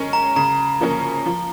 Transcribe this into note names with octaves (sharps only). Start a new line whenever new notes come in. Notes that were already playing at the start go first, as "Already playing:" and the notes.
Already playing: G#3 C#4 A#4
A#5
C#3 A#5
F3 A#3 C#4 A#4
F3